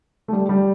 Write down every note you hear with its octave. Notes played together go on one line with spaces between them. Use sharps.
A3
G3
G3